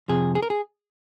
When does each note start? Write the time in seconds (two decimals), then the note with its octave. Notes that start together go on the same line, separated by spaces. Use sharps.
0.08 F2 C3 F3 G#4
0.35 G#4
0.42 A#4
0.50 G#4